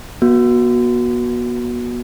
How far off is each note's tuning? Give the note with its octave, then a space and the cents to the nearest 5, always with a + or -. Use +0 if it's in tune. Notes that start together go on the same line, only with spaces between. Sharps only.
B3 -40 F#4 -10